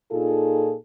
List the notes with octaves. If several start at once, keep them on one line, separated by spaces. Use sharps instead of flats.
A#2 D#4 F4 G#4 A4